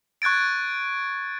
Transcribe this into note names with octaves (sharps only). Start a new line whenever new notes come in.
C#6 F#6 G#6 A6 D7